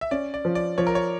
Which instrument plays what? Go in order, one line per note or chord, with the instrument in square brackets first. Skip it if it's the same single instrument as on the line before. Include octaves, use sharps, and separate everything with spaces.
[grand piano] E5
[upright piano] C#4 [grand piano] D5
[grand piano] D5
[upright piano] F3
[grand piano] D5
[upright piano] F3 [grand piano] C#5
[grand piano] A#4
C#5